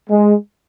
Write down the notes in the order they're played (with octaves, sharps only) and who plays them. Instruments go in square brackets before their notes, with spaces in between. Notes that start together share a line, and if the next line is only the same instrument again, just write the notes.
[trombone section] G#3